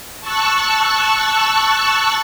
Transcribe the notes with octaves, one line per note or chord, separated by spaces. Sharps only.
A5 C#6 E6 F#6